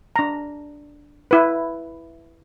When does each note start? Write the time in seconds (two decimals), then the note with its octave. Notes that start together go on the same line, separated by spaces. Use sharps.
0.16 D4 A#5
1.31 E4 B4